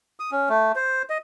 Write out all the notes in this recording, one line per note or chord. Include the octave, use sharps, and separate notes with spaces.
D#6
C#4
A3
C5
D#5